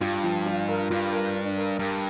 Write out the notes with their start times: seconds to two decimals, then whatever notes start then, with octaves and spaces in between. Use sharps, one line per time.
0.01 G2 F4
0.24 F3
0.46 F4
0.69 A#4
0.90 G2 F4
1.13 A#4
1.35 D4
1.58 A#4
1.79 G2 A#4